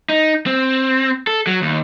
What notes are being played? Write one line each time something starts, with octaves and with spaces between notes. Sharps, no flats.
D#4
C4
A4
F#3
D#2